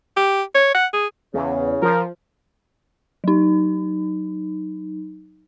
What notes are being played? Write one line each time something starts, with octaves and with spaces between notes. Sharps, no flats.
G4
C#5
F#5
G#4
E2 C#3
F3 A#4
F#3 D#4